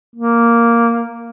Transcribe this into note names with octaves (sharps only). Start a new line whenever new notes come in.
A#3